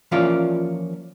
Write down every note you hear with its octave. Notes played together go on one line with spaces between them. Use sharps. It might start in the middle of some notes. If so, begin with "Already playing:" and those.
E3 F3 A#3 C#4 F4 D5